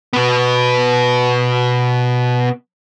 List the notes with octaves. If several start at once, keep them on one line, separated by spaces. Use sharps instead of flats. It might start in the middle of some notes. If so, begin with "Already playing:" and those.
B2 B3